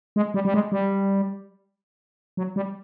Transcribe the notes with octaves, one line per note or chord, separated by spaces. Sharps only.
G#3
G3
G3
G#3
G3
F#3
G3